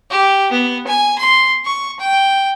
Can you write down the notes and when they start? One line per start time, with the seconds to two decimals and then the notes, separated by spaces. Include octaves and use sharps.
0.11 G4
0.51 B3
0.87 G#5
1.19 C6
1.65 C#6
1.99 G5